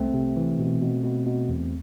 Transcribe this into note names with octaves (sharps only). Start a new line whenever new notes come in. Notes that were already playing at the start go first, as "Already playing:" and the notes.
Already playing: C2 A3 C4
C3
E3
B2
B2
B2
B2
E2